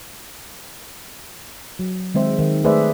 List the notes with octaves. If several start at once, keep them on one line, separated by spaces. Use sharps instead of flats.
F#3
D#3 G#3 C4 C5 E5
D#3
A3 G#4 B4 C5 D5 E5